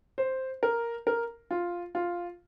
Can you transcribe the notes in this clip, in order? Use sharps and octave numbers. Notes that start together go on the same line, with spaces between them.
C5
A#4
A#4
F4
F4